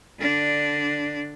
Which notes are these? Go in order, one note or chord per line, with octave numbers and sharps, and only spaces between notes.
D3 D4